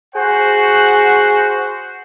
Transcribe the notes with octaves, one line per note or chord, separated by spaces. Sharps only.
F#4 G#4 C5 F#5